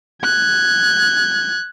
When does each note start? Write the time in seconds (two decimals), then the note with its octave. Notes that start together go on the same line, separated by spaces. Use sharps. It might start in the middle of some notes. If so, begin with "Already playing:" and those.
0.23 F#6 G#6